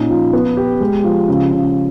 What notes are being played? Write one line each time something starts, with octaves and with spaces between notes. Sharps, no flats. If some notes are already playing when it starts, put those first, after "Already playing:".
Already playing: A#2 C#4 D#4
F3
B3
G4
G#3
F3
C#3
C#3